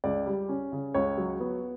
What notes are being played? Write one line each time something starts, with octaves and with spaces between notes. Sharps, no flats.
C#2 D5
G3
C#4
C#3
C#2 C#5
F#3
B3